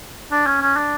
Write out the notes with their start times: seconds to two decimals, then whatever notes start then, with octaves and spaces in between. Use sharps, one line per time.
0.32 D4
0.46 C#4
0.61 C#4
0.76 D4